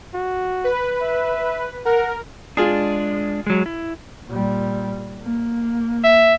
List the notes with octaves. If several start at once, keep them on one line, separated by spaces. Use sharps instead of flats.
F#4
B4
E5
A#4 F#5
G#3 D4 F4 G#4
F#3 G#3
E4
A#2 G3
A#3
E5